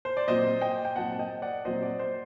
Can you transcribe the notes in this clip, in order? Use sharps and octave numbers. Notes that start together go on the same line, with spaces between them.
C5
D5
A#2 F#3 C4 C5 D#5
D#5 G5
G5
A#2 F#3 C4 F#5 A5
A5
D#5 G5
D5 F#5
A#2 F#3 C4 C5 D#5
D5
C5